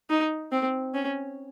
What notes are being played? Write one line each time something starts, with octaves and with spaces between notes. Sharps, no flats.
D#4
C4
C#4